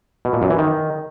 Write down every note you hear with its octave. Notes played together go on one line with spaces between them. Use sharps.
B2
A#2
F#2
E3
D#3